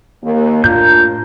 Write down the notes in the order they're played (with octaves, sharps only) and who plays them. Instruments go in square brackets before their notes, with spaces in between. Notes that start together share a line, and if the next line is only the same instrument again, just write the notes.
[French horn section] D#2 A#3
[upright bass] A2 [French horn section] A#3 D4 F4 [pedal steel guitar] A#5 G6